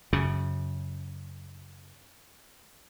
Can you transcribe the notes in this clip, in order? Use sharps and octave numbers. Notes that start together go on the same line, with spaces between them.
F#2 C#3